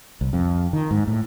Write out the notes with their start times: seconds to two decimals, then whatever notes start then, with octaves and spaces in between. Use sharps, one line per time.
0.21 C2
0.33 F2
0.73 D#3
0.91 G#2
1.07 A2